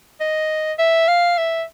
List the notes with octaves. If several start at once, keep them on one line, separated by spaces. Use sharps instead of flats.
D#5
E5
F5
E5